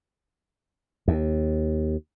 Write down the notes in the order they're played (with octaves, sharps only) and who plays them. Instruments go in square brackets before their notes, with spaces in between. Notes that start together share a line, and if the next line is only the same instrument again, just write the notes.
[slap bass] D#2